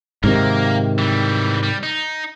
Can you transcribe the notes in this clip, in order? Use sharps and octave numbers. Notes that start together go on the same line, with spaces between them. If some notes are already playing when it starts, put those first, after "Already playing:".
G#2 C3 D#3 A#3 A#4
E3 G3
G3
D#4